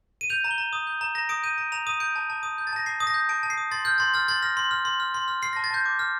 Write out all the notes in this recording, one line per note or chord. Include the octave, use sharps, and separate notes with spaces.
D#7
G6 F7
A#5
G7
A#5
D#6
G6
A#5
A#5 A#6
D#6 D7
G6 D#7
A#5 D7
A#5 F7
D#6 D#7
G6 D7
A5
A5
D#6
G6
A6
A5 A#6
A5 C7
D#6
A#6
G6
A5 D7
A5
C7
D#6
C6 A6
F6 G6
C6 A6
F6 A6
C6 A6
F6 A#6
C6
F6
C6
F6
C6
F6
F6 C7
A5 A#6
A6
A5 G6
D6
F6